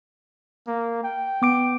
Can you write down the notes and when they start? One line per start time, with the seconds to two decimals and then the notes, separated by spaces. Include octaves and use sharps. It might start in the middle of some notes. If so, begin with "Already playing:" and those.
0.67 A#3
1.04 G5
1.42 B3 D6 D7